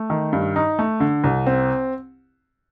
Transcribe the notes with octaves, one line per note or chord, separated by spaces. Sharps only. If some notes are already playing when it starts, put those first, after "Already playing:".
Already playing: A3
D#3
G2
D#4
A3
D3
C2
C4